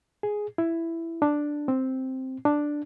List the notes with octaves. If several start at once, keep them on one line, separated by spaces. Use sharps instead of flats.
G#4
E4
D4
C4
D4